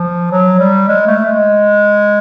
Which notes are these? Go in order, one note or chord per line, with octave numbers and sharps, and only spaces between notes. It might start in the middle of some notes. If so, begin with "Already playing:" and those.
Already playing: F3
F#3
G3
G#3
A3
G#3